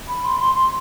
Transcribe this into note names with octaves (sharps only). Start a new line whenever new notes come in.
B5
C6
C6
C6